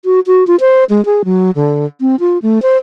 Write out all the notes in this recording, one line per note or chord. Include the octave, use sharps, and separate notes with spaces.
F#4
F#4
F4
C5
G#3
G#4
F#3
D3
C4
F4
A3
C5